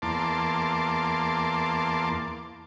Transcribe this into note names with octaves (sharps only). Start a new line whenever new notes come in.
E2 A#3 A5 C6 D6